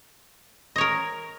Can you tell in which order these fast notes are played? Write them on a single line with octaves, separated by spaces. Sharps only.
D#5 C#5 A#4